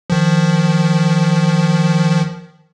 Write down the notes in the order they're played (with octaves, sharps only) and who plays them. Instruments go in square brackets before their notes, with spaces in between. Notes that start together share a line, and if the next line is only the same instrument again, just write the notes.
[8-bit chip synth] D#3 F3